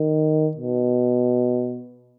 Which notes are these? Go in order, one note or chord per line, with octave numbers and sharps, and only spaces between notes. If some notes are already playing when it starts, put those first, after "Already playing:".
Already playing: D#3
B2